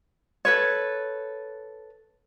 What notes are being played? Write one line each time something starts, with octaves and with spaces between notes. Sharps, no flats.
A4 B4 C#5